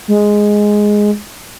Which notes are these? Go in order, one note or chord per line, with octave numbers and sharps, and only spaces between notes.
G#3